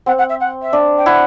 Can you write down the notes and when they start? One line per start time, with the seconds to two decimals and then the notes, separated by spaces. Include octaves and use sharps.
0.06 C4 F#5
0.18 F#5
0.29 E5
0.40 F#5
0.62 E5
0.73 D4
0.97 G5
1.06 E4 F#5